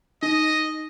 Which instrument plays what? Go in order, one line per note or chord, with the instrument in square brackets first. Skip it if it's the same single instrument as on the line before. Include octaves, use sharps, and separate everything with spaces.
[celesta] D#4 [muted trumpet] D#5